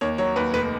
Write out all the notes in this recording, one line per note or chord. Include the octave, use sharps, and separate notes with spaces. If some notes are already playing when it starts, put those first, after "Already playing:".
D#2 C#5
F#3 C#5
D#2 B4
F1 B4